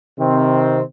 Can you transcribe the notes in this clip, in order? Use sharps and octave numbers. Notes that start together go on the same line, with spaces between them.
C3 D#3 C4